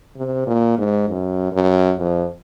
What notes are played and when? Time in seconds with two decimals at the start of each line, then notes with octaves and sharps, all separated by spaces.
0.17 C3
0.47 A#2
0.78 G#2
1.08 F#2
1.53 F#2
1.99 F2